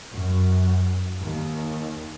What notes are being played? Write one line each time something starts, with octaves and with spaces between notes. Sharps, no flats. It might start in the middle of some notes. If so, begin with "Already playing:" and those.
F#2
D#2